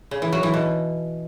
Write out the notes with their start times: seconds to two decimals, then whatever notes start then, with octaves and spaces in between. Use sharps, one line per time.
0.11 C#3
0.22 E3
0.32 F#3
0.43 E3
0.54 B2